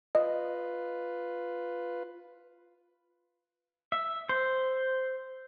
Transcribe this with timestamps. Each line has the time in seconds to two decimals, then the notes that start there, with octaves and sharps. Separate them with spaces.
0.15 F4 B4 D#5
3.92 E5
4.29 C5